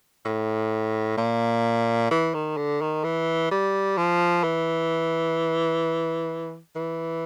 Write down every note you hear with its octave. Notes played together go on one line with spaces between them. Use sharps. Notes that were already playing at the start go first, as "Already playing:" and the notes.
A2
A#2
E3
D#3
D3
D#3
E3
G3
F3
E3
E3